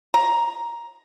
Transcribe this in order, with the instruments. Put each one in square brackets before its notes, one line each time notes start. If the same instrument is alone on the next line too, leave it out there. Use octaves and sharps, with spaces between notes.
[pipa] A#5